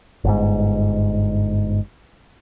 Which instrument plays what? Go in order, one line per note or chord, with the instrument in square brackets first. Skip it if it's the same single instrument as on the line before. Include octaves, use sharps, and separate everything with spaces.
[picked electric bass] G1 G#2